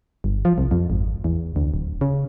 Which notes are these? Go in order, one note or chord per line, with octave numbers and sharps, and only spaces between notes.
G1
F3
C2
F2
G#1
E2
D2
D1
C#3